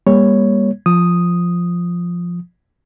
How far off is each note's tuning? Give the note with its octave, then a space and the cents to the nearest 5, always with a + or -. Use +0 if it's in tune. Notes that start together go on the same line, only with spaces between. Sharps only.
G3 +40 A#3 +30 C#5 +5
F3 +0 D#6 +0